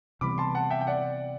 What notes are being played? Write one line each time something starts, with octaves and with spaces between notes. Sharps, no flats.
C3 E3 G3 B3 B5 D6
A5 C6
F#5 A5
E5 G5
G5
D5 F#5